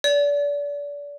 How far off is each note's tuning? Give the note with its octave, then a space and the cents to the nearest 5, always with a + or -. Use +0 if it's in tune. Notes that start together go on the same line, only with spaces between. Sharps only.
D5 -30